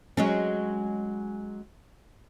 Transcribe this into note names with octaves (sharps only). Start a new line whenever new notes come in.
F#3 G#3 C#4